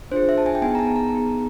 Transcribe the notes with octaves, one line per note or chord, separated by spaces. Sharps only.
D4 F4 G#4 C5
E5
A5
G#5
G5
B3 D#4 G#4 G#5
A#5
A5
A#5
B3 D#4 G#4